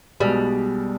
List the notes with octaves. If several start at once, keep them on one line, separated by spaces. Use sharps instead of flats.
B1 B2 G3 G#3